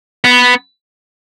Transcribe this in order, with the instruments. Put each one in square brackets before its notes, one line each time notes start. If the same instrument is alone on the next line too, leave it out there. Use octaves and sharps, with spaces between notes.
[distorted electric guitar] B3